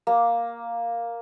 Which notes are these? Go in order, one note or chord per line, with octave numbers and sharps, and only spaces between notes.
A#3